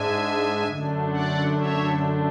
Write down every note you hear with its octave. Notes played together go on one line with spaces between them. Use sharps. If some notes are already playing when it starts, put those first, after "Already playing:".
Already playing: G#2 G#3 D4 E5 G#5
F#2 D3 A3 D4
D5 F#5
C#5 E5